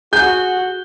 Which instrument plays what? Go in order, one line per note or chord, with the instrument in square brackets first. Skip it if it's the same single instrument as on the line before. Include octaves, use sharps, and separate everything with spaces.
[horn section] F#4 [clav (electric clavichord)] G#4 [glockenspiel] F#6 G7 [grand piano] G6